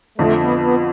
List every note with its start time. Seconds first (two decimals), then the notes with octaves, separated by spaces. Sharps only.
0.18 F2 D3 F3 A3
0.39 B3
0.60 B3